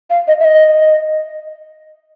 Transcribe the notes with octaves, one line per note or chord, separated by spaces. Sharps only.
F5
D#5
E5
D#5